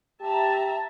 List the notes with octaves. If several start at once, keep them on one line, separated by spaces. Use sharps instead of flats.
G4 E5 A5 A#5